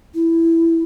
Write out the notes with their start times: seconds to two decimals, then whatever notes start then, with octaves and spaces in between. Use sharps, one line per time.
0.14 E4